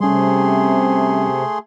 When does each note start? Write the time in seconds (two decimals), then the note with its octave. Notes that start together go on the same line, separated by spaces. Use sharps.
0.01 C3 G3 A3 C#4 G#4 C6